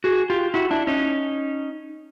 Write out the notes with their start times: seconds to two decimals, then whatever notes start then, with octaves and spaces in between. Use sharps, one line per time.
0.04 F#4 G#4
0.30 F4 G4
0.54 E4 F#4
0.71 D4 E4
0.87 C#4 D#4